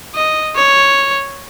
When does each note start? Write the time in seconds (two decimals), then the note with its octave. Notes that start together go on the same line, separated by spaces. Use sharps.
0.15 D#5
0.56 C#5